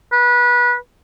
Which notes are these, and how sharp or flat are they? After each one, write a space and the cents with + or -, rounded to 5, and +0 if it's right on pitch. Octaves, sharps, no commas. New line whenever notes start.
B4 -25